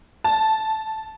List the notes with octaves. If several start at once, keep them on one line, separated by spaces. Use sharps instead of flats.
A5